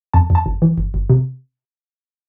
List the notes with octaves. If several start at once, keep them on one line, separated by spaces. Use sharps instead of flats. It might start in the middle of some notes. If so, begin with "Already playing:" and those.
F2 A5
F2
A5
G1
E3
G1
G1
C3